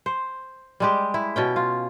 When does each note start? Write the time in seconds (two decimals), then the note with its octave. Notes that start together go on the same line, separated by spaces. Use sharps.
0.06 C5
0.80 G3 G#3 G4
1.14 E4
1.36 B2 C#4 G5
1.56 F4